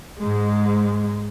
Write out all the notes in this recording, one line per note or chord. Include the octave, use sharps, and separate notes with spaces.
G#2 G#3